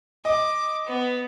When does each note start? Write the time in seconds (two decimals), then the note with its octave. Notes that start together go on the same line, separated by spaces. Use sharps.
0.25 D#5 D6
0.86 B3